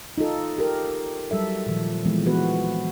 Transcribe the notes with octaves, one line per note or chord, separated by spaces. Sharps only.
D#4 F4 A4
G4 A#4
F#3 G3 A4 E5
A#2 D#3 F3
E3 F3 G#3 B3 C4
E3 F3 B3 F#4 B4